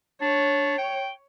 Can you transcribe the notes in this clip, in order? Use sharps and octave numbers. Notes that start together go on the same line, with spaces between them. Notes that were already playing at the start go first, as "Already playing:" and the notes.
D4 C#5
G5